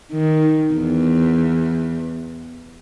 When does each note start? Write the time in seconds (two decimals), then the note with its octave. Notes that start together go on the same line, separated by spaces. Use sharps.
0.12 D#3
0.73 E2